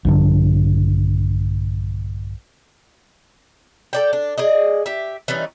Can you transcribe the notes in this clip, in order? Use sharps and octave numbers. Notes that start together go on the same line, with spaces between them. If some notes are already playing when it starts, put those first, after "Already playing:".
A#1 G2 D3
A4 D5 G5
D4
G#4 D5 D#5
G4 E5
E3 G3 C#4 D#4